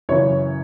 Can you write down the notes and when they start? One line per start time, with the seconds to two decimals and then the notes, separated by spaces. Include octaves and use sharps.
0.09 F#2 C#3 E3 C#5